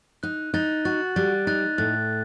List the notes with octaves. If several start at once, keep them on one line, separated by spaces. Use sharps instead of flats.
D#4 F#6
D#4 F#6 A6
F#4 F#6 A6
G3 F#6 A6
D#4 F#6 A6
A2 F#6 A6